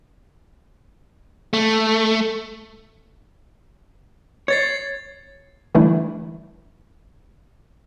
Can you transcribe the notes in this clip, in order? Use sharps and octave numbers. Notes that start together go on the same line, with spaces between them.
A3
C#5 G#6 A6 C7
D3 E3 G3 A3 D4 E4